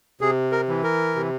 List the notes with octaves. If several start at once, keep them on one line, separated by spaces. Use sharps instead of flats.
C3 G#4
A#4
E3
A#4
C3